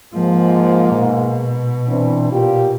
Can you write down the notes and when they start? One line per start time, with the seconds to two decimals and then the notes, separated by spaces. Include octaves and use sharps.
0.14 G#2 F3 G#3 A#3
0.96 B2
1.88 E3 C4 D4
2.31 A#2 F4 G4